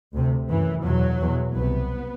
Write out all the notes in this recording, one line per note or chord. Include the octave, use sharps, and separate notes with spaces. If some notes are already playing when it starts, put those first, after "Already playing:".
D2 C3
F#2 E3
E2 B2 F#3
E2 B2
C2 C3 B3